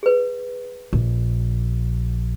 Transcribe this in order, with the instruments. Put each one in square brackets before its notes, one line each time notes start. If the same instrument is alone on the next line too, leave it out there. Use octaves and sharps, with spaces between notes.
[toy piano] G#4 B4
[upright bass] A#1